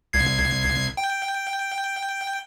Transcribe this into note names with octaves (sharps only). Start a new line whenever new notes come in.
C2 G#6 C7
G5